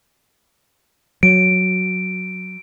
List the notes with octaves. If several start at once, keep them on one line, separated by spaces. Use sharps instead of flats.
F#3 D7